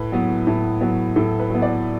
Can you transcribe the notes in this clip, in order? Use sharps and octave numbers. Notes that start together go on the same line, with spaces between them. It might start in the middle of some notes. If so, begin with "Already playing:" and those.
Already playing: A2 B4
F#3 B3
A2
F#3 B3
A2 A4
B4
F#3 B3
D5